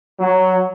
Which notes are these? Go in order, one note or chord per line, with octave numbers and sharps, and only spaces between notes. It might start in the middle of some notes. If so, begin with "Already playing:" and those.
F#3